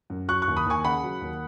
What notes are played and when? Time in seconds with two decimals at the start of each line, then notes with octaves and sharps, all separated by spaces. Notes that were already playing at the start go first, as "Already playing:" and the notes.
0.10 F#2
0.28 F#3 C#6 F#6
0.42 C#6 F#6
0.48 D#2
0.57 B5 D#6
0.66 D#2 G#5 C#6
0.85 C#3 F#5 B5
1.03 F#3
1.21 D#2